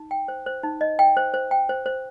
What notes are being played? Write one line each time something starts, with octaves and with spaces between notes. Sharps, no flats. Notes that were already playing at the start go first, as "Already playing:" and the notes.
Already playing: D#4
G5
C5
C5
D#4
D#5
G5
C5
C5
G5
C5
C5